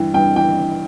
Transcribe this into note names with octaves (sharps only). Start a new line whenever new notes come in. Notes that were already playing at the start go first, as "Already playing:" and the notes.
Already playing: G2 E3 G5
G2 G5
E3 G5